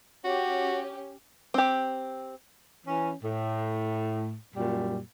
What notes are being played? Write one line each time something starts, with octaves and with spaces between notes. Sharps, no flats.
C#4 F#4 G4
C4 G4
E3 C#4
A2
F#2 A#2 G3